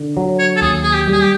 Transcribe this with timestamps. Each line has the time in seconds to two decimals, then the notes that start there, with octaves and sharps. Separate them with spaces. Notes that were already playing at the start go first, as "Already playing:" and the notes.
Already playing: D3
0.17 F#3
0.39 C#5
0.56 A4
0.62 D#2 G#4
0.83 G#4
0.93 G4
1.07 G3 G#4
1.22 G4